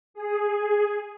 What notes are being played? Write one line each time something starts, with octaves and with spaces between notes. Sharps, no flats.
G#4